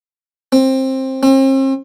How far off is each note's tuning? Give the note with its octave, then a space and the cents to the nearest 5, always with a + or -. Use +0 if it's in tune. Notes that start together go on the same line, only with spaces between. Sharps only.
C4 +15
C4 +40